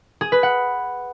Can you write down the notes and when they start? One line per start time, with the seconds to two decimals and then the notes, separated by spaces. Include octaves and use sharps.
0.21 G#4
0.32 B4
0.43 F#5